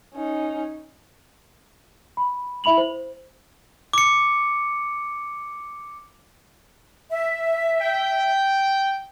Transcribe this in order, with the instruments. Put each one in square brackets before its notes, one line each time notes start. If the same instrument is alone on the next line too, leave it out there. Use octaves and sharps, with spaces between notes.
[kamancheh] C#4 D#4
[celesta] B5
E4 E5 B5 F7 F#7
C5
[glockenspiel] D6 C#7
[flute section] E5
[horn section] G5